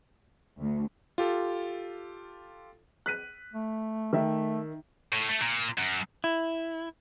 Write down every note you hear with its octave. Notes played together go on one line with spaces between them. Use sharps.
D2
F4 G4 A4
F#6 B6 D#7
A3
D#3 A3 E5
A2
A3
A#2
F#2
E4